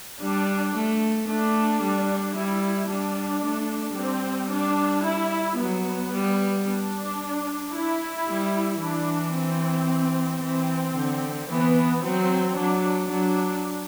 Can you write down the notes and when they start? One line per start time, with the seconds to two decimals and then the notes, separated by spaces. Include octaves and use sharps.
0.21 G3 D4
0.75 A3
1.28 A3 D4
1.82 G3
2.37 G3 E4
2.90 G3 D4
3.43 A3
3.97 G3 C4
4.52 D4
5.05 E4
5.59 F#3 B3
6.13 G3
6.67 D4
7.74 E4
8.28 G3
8.81 E3 D4
9.35 C4
10.42 E3 C4
10.96 D3
11.50 E3 B3
12.04 F#3 C4
12.58 F#3 D4
13.11 F#3 D4